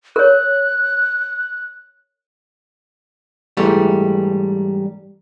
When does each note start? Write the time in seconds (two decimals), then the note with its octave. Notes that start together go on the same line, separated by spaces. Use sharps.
0.16 A#4 C#5 F#6
3.57 G#2 E3 G3 A3